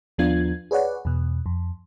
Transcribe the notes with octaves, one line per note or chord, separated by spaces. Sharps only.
D#2 F3 B3 D4 F4 G#6
G#4 B4 C#5 D5 F#5
E2 B2
F2